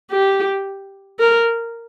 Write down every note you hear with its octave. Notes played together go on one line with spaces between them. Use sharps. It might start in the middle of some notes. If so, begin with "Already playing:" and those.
G4
A#4